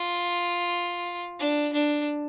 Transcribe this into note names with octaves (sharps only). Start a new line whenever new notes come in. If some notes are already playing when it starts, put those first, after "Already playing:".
Already playing: F4
D4
D4